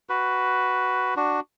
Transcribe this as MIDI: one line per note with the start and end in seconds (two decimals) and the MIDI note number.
0.09 1.14 66
0.09 1.14 71
1.17 1.40 62
1.17 1.40 66